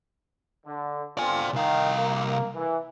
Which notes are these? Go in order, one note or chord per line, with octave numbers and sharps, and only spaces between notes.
D3
D3 C4 F4 D5 G#5
C2 D#3 F5
A#3
E3